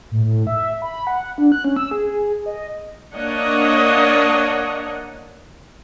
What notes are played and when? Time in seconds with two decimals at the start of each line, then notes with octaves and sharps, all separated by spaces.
0.11 A2
0.25 A2
0.47 E5
0.82 B5
1.07 F#5
1.38 D4
1.52 F#6
1.64 C#4
1.76 E6
1.91 G#4
2.46 D#5
3.14 A#3 D4 C#5 D#5 F#5